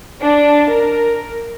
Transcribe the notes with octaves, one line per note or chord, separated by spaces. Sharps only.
D4
A#4